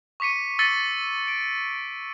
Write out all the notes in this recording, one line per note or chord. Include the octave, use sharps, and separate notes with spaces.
C#6 D6 B6 C#7 D#7
E6 A6 B6 C#7 D#7 G7
D7